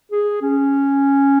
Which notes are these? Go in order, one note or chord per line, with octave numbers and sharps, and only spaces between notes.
G#4
C#4